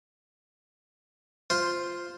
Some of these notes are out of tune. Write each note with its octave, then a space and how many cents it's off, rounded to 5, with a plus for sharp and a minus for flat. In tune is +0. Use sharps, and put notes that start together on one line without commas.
F4 +0 C5 +0